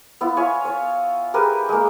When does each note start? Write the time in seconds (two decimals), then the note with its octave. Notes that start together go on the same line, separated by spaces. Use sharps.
0.21 B3 E4 F4
0.37 F4 C#5 E5 G#5
0.65 C#5
1.34 G4 G#4 A#4 B4
1.69 G#3 A#3